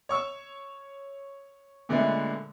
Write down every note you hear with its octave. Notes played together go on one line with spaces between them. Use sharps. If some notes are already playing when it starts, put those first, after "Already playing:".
C#5 C#6 E6
A#2 D3 G#3 A3 B3